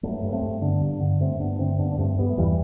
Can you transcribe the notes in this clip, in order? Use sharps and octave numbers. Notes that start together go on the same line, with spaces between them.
G2 F#3 A3
G2
A3 C4
G2
D3 B3 D4
G2
D3
G2 A3 C4
G2 B3 D4
D3 A3 C4
G2 B3 D4
D4
G2 A3 C4
G2 G3 B3
A3
E2 E3 G3